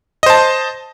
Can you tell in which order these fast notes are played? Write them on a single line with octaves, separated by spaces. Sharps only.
D#5 C5 A5